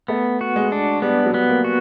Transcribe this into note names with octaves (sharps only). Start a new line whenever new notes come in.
A3 B3
F#4
G#3
D4
G3 B3
F#3
B3
A#3
F#4